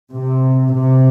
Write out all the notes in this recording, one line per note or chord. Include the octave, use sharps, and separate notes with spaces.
C3
C3